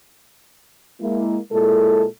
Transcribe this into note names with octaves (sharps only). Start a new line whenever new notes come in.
G#3 A#3 E4
A#2 G#3 E4 A4